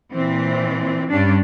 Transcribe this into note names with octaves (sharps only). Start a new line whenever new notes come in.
A#2 E3 C4
G2 G3 C#4 D4